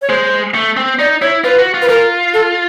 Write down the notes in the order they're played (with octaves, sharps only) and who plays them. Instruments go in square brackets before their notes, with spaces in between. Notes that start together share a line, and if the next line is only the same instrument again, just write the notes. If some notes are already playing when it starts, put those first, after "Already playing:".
[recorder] C#5
[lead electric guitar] G#3 [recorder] C5
[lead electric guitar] A3
C4
[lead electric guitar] D#4 [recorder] D5
[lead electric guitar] E4 [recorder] C#5
[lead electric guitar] F4 [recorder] B4
[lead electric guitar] F#4
F4
[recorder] B4
[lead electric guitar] F4 [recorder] A#4
[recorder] A4